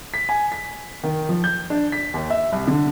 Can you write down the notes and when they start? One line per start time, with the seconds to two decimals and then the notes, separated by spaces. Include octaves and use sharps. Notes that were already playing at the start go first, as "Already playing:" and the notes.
0.14 B6
0.29 G#5
0.52 B6
1.03 D#3
1.29 F3
1.44 G6
1.70 D4
1.92 B6
2.14 D#2
2.30 E5
2.52 C2
2.67 D3